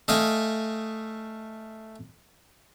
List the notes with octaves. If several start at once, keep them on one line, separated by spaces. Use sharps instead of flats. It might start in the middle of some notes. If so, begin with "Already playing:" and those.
A3 D#5 F5 G5 G#5